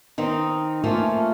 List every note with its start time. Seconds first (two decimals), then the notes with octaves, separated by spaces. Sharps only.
0.18 D#3 C4 D#4
0.84 F3 A3 A#3 C#4 F4